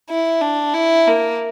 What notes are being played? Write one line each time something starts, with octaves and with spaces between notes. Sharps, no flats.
E4
D4
E4
A#3